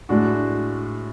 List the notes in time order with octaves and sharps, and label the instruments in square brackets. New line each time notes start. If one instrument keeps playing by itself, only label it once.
[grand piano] A2 G#3 D4 F#4